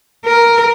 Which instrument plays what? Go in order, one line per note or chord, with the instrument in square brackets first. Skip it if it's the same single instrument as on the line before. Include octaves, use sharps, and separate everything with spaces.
[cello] A#4